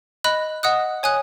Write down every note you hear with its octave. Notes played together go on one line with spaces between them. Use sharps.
D#5 B5 F#6
D#5 F#5 D#6 F#6
C#5 G#5 D#6 F#6